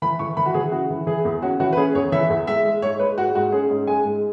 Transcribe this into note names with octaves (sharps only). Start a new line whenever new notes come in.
E3 B5
E3 C#6
E3 B5
F#4
E3 G#4
C#3 F#4
E3
E3 G#4
E2
C#4 F#4
E3 F#4
B4
C#4 G#4
E2 C#5
E3 E5
E2
G#3 E5
G#3
G#2 C#5
G#3 B4
G#2 F#4
G#2 F#4
C#4 G#4
G#2
G#3 G#5
G#2